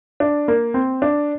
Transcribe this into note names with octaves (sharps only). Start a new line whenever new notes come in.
D4
A#3
C4
D4